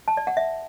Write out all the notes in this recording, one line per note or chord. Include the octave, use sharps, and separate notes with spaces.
A5
D5
F#5
E5